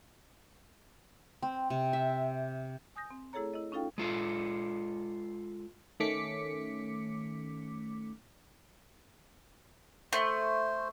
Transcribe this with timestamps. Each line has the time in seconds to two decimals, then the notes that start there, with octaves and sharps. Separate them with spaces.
1.43 C4
1.70 C3
1.93 E5
2.96 G#5 D#6 G6 A#6
3.11 C4
3.33 A3 E4 G#4 A4 C#5 A#5
3.54 E4 D#5
3.72 C#4 D#4 F4 A4 F5 G5
3.98 G#3 F4 A4
6.00 D#3 A3 C#4 D6 B6 C#7
10.13 A3 C5